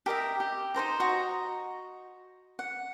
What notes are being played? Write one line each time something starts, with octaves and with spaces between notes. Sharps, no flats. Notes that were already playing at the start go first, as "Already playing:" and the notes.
G4 A#4 D#5 E5
G4
D#4 A#4 C5 A#5
F#4 D#5 A#5
F#5